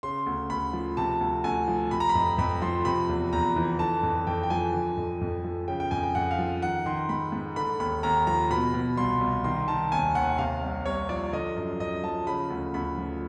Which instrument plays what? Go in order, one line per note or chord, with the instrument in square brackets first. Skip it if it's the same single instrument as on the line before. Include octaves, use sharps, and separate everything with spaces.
[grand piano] C#3 C6
D2
D2 B5
F3
C3 A5
D2
D2 G#5
F3
C3 B5
A#5
B5
F2
F2 B5
F3 C6
C3 B5
E2
E2 A#5
E3
D3 A5
F2
F2 G5
G5
F3 G#5
D3
F2
F2
F3
C#3 G5
G5
F2 G#5
G5
F2 F#5
F5
F3
D#3 F#5
D#3 C6
G#2 B5
G#2
D3 B5
D#2 B5
D#2 A#5
F3 A#5
B2 B5
B2
C2 C6
C2
D#3 C6
D#3 A5
D#2 G#5
D#2 F#5
C3 F5
C2
C2 C#5
F3 D5
D3 D#5
F#2
F#2 D#5
F3 A5
C#3 B5
D2
D2 B5
F3